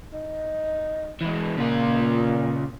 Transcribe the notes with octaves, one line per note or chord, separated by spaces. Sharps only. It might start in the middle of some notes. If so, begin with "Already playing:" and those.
D#4
E3 G#3
A#2 C#3 F4